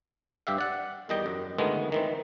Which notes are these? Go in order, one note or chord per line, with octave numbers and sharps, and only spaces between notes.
G2 G4 E5 F5
D5 F#5
E2 D#3 G3 D#5 G5
F#2
D2 D#3 E3 G#3 B3
D#3 E3 C4